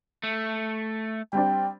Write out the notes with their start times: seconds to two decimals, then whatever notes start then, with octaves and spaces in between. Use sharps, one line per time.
0.23 A3
1.33 G3 C4 D4 G5